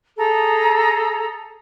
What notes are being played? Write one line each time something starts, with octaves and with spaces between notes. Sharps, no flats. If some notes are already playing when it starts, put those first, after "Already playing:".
G#4 A4 A#5